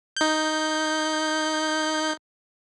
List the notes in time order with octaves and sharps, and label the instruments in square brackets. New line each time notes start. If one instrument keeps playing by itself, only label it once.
[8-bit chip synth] D#4 G6